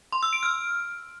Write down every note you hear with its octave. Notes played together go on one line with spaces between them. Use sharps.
C6
E6
D7
F6